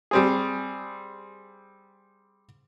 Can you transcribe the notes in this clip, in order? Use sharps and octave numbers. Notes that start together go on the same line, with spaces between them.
G3 C4 G#4